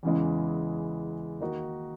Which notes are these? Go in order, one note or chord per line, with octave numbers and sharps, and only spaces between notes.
E2 C#3 E3 G#3
D#3 A#3 D#4 F#4